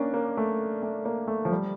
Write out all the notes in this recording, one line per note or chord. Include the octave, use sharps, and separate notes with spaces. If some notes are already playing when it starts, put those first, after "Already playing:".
Already playing: A#3 C#4 D4
A#3
A3
A3
A#3
A3
F3
G3